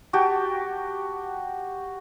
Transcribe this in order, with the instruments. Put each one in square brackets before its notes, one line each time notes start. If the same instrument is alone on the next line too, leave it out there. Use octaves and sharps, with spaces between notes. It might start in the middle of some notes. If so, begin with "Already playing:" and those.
[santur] F#4 G4 G5 A5